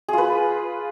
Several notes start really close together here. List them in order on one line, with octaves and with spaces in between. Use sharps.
G#4 F4 B4